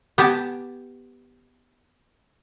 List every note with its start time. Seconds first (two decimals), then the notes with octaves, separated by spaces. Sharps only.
0.18 B3 G4 G#5 A5